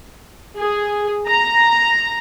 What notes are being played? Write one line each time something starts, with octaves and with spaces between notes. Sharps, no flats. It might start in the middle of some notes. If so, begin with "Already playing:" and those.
G#4
A#5